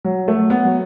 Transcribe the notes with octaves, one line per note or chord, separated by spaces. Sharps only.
F#3
A3
F#3
B3
F#3